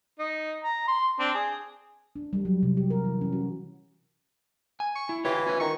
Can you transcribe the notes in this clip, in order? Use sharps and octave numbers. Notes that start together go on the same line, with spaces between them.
D#4
A#5
C6
C4 D4
G#4
D4
G3
F#3
C3
G4
A#4
E3
C#4
F#4
G#5
C#6
E4
E3 F4 G4 C#5
C#4 F4 B4
D#3 C#6